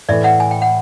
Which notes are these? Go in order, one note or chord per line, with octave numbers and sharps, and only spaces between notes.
A2 E3 A3 D5 E5
E5 F#5
G#5
G5
F#5